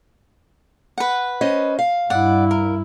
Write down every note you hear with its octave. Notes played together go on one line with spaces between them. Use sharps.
B4 F#5
C#4 C5 D#5
F5
G2 E4 D5 F#5
A#4